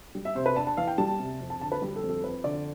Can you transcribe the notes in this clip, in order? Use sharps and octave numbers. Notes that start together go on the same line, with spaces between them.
G3
E5
C3 C5
B4
D4 A5
A5
E3 F5
G5
G3 A5
C3
F2
A5
D3 A5
B4
G3 G4
A4
F2
A4
F2 B4
D3 D5